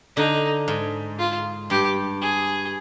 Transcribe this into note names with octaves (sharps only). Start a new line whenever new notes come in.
D3 D#4
G#2
F4
G2 G4
G#4